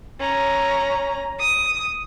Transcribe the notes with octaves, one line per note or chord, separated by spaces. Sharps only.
C#4 A#5
D#6